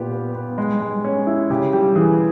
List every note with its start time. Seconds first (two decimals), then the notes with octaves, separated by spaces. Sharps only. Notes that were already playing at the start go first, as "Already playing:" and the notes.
Already playing: A#2 B3 G4
0.12 B3
0.35 B3
0.58 G#3
0.80 G#3
1.04 C#4
1.27 E4
1.50 C#3 G4
1.73 G3 G4
1.96 E3 G#4